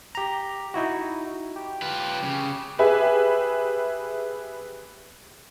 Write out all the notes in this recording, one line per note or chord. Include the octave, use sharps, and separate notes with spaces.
G4 A#5
D#4 E4 F#4
G4
F4 B4
C#3
G4 G#4 B4 E5 G#5